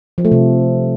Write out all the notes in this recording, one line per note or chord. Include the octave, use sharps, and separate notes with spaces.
F3
A3
C3